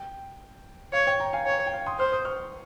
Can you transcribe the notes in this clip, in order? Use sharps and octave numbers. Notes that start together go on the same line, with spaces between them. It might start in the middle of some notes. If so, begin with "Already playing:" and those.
Already playing: G5
C#5 F5
G5
G5 A#5
F5 G#5
C#5 G5
G5
F5
C6 D#6
C5 F6
D#6
C#6 F6